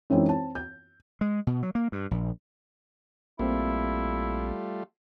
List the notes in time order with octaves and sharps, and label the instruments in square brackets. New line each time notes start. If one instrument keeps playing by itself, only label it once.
[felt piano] F#2 E3 G#3 C4 D#4 E4
C4 A5
G6
[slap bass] G#3
B2
F#3
A#3
G2
A#1
[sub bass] A#1 [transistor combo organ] G3 A3 F4 [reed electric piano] A#3 C4 [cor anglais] E4